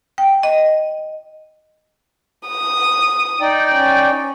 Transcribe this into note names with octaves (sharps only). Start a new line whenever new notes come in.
G5
D#5
D#6
D#4 D5 G5
C#4